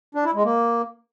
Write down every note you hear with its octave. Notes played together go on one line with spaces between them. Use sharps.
D4
E4
G#3
A#3